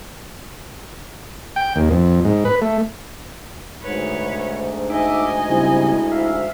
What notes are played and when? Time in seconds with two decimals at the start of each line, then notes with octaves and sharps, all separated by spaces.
1.56 G5
1.76 D#2
1.91 F2
2.25 G#2
2.45 B4
2.62 A3
3.82 D2 G#2 B4 C#5
4.90 D#4 D#5 E5 G#5 D6
5.49 C#3 G3 C4 E4
6.12 E5 F5